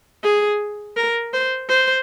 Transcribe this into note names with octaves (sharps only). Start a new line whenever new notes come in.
G#4
A#4
C5
C5